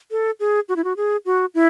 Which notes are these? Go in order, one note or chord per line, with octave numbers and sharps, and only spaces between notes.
A4
G#4
F#4
E4
F#4
G#4
F#4
E4